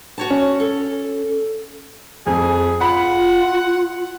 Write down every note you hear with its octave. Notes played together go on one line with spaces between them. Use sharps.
F#4 C#5 A5
C#4
A4
F2 G#4
F4 F#5 B5